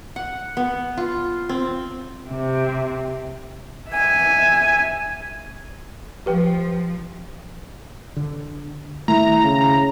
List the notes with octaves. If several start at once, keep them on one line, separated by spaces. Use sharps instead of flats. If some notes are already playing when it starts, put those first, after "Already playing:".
F#5
B3
F4
C4
C3
E5 G#5
F3 G4 B4 G5
D3
D#3 A3 E4 A#5
C#3